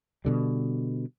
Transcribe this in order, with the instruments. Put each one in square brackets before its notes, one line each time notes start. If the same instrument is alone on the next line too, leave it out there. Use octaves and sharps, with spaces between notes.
[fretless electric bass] B2 D3 G3